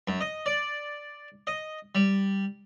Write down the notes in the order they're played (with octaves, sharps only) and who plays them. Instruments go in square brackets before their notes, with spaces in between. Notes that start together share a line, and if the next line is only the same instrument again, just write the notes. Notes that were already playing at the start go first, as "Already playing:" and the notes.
[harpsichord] F#2
D#5
D5
D#5
G3